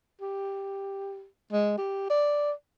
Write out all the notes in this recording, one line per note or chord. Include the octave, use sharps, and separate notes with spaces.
G4
G#3
G4
D5